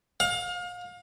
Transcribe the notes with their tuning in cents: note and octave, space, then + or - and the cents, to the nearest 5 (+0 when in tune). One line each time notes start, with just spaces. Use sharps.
F5 +35